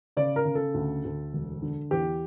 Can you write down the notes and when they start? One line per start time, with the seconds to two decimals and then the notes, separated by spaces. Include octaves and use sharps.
0.17 C#3 D5
0.36 A#4
0.45 C#3
0.55 A4
0.74 D2
1.05 D2
1.33 E1
1.62 D3
1.91 E2 G4